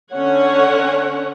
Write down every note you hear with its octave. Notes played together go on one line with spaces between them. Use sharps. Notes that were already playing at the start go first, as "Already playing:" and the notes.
D3 C#4 C#5 F#5